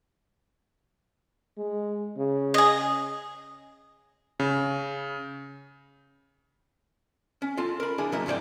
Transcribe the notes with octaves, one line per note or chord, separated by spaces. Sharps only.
G#3
C#3
G#4 D#5
C#3
C#4
F4 A4 C6
A#4 B5
D4 E4 G#4
C#3 F#3 G#3 A#3 E4 A#4
F2 G#2 F4 D5 G5